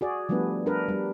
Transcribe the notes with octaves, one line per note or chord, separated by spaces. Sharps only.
F#4 G#4 D5
F3 G3 A3 B3 D4 B4
D4 A#4 B4
G3